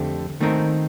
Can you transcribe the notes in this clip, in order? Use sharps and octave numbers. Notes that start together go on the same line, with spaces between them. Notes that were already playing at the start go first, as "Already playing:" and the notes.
Already playing: F2 D3 A3 C4 G4
D#3 A3 C4 D#4 A#4